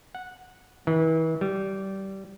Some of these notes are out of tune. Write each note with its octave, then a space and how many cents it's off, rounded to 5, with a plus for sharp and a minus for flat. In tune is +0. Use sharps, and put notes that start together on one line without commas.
F#5 -10
E3 -35
G3 -20